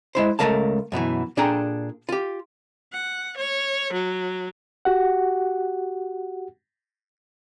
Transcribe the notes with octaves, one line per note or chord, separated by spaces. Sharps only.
G#3 E4 C5
C#2 E3 A3 A#4 F5 A5
F#2 B2 D#3 E3
A#2 D4 G#4 A4 G5 A#5
F4 G4
F#5
C#5
F#3
F#4 G4 F#5